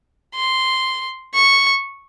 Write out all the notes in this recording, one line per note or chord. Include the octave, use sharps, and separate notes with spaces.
C6
C#6